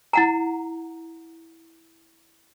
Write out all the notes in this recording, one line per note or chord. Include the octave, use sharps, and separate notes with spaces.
E4 F#5 A#5